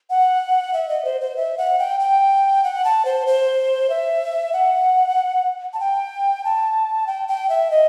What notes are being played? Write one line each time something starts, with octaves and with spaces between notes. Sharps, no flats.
F#5
E5
D#5
C5
C5
E5
F#5
G5
G5
F#5
A5
C5
C5
E5
F#5
A5
G5
A5
G5
G5
E5
D#5